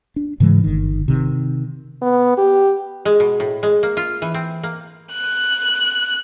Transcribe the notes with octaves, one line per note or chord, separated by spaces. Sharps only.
D4
G#2 C#3 E3 G#3
G1 D#3
C3 D#3
B3
G4
G#3
B2
A2
G#3
A#3
F4
E3
C4
A#3
F#6